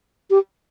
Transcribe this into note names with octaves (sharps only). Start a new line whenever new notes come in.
G4